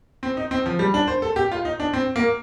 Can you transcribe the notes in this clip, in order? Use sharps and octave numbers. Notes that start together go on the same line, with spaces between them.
C4
D#4
C4
F3
G3
D4
C5
A4
G4
F4
D#4
D4
C4
A#3